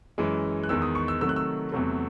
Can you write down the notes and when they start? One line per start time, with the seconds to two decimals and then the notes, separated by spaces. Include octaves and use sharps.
0.18 F#2 E3 G#3
0.64 F#6
0.69 E2 D#3 G#3 E6
0.82 D#6
0.95 C#6
1.08 E6
1.20 C3 D#3 F#3 A3 E6
1.29 F#6
1.36 E6
1.72 E2 C3 F#3 A3